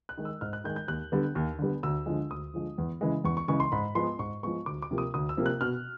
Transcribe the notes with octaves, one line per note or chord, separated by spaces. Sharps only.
F#6
D#3 G#3
E6
G#2 F6
F#6
D#3 G#3 G6
G6
D#2 F#6
D3 G3 B3
D#2
D3 G3 B3
D2 E6
D3 F3 G#3
D2 D#6
D3 F3 G#3
E2
C#3 E3 G#3
E2 C#6
C#6
C#3 E3 G#3 C#6
C6
G#2 B5
F3 G#3 B3 C6
G#2 C#6
F3 G#3 B3 C#6
D2 D6
D6
C3 F3 A#3
D#6
D2 D#6
E6
C3 F3 A#3
F#6
B2 F6